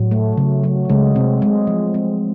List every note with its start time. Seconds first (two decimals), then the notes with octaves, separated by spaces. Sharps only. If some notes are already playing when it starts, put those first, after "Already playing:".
Already playing: A2 F#3
0.11 A3
0.37 C#3 F#3
0.64 F#3
0.90 C#3 G#3
1.15 C3 C4
1.42 G#3
1.67 F3
1.94 C4